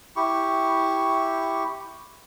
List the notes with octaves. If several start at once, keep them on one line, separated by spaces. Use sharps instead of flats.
E4 G4 C#6